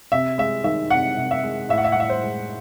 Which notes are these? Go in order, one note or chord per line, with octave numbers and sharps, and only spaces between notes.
C3 E5
G#3 E5
D#3 E5
C3 F#5
C3
E5
G#3
A2 E5
F#5
E5
F#5
A2 E5
C5
G#3